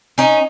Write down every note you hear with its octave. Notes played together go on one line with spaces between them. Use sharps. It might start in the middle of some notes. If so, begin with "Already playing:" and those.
C#4 D#4